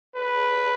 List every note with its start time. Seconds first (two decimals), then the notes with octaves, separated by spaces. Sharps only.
0.15 B4